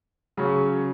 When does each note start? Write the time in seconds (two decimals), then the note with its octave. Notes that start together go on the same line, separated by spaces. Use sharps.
0.37 C#3 F#3 C#4